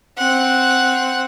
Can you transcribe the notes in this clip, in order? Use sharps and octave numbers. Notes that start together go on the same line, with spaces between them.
C4 F#5